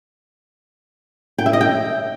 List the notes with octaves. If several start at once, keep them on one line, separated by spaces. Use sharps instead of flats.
G5
E5
D#5
G5